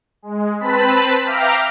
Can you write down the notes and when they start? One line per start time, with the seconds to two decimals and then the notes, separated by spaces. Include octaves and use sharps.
0.22 G#3
0.60 C4 B4 A5 B5 B6
1.25 E5 F5 G5 A#5 D6 F6